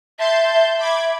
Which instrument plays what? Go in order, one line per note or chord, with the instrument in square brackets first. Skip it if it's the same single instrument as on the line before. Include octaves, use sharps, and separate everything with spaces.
[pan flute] E5 [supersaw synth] A5 C6 G6
[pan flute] E5 [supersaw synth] B5 D6 G#6